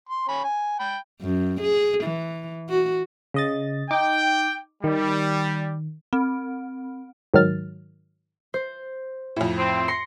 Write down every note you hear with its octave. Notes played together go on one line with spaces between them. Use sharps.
C6
C#4 B5
G#5
G5 B5
F#2
G#4
E3
F#4
C#3 D#5 A6
D#4 G5 D6
D#3 G3
C4
G#2 D#3 F#3 F6 A6
C5
F2 A2
C4
C6 A#6 C7 C#7